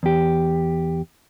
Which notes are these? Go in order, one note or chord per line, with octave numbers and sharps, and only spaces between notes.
E2 G4